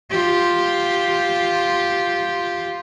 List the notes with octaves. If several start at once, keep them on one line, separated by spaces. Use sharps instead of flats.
F4 G4